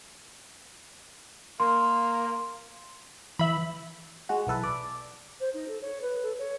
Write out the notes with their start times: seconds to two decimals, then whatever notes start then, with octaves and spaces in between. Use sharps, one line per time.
1.60 A#3 C6
3.39 E3 E5 B5
4.29 G#3 F#4
4.47 B1 E3 A4 B4
4.64 D5
5.40 C5
5.54 D#4
5.68 A4
5.81 C#5
6.01 B4
6.22 A4
6.38 C#5